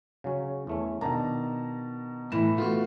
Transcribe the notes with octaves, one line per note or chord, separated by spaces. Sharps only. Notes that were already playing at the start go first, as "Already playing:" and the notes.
C#3 F#3 C#4
E2 A3 C#4
B2 D#3 D4 A5 A#5
A2 E3 B5 E7
A3 B3 F4 F#4